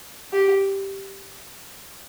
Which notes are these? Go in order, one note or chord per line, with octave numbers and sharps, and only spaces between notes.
G4